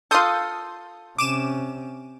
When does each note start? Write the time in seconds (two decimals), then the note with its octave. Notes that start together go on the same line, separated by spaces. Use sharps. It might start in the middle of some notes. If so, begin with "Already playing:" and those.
0.11 F4 A4 C6 D#6 G6
1.18 C3 C#4 D6 D#7 E7